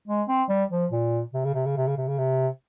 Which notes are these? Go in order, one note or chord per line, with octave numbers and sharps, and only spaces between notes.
G#3
C4
G3
F3
A#2
C3
C#3
C3
C#3
C3
C#3
C3
C#3
C3